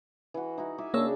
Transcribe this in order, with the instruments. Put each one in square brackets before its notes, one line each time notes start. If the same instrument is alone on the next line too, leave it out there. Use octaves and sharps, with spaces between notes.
[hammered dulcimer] E3 F#4
D#4 E4 F#4
E5 G#5 D6
[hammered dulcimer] C#3 D4 [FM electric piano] A#3 C#5 E6